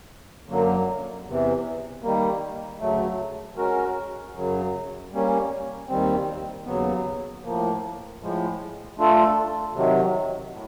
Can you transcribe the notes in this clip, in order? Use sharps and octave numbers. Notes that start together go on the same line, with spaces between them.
F#2 D3 F#3 A#3
E2 C3 E3
D#3 G3 A#3
D2 C#3 F#3 A3
G#3 C#4 F#4 A#4
F#2 C#3 F#3
G3 A#3 C#4
D#2 D#3 G3 C4
D#2 C#3 F#3 B3
A2 F3 A#3
A2 F3 G#3
A3 D4 F4 A4
C3 D#3 F#3
A2